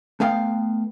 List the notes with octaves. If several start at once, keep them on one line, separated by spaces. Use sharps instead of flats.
A3 B3 F5 G5